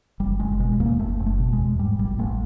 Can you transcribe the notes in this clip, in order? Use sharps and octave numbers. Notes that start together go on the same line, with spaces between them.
F#1 G3
F#1 G#3
B2 G#3
E2 A#3
F#1 A3
F#1
A3
B2
G#3
E2
G#2 G3
A1 G3
A1 A3